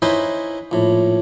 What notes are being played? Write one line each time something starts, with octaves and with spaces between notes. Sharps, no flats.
C#4 D#4 E4 B4 C5
A#1 A2